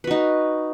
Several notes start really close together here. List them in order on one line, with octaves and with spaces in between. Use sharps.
B4 F#4 D#4